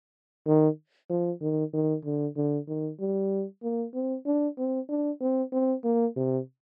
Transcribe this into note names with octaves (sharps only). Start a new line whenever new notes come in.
D#3
F3
D#3
D#3
D3
D3
D#3
G3
A#3
C4
D4
C4
D4
C4
C4
A#3
C3